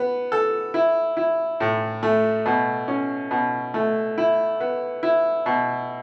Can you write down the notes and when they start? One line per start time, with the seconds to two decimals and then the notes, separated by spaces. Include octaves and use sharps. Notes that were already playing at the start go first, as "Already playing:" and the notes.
Already playing: B3
0.32 A4
0.74 E4
1.17 E4
1.60 A2
2.03 A3
2.46 B2
2.88 C#4
3.31 B2
3.74 A3
4.18 E4
4.60 B3
5.03 E4
5.46 B2